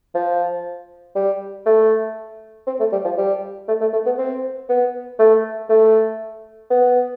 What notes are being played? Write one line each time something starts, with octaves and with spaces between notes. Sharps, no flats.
F3
G3
A3
C4
A3
G3
F3
G3
A3
A3
A3
B3
C4
B3
A3
A3
B3